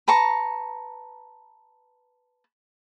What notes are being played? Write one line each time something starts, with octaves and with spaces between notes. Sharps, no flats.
B4 A5 A#5 C#6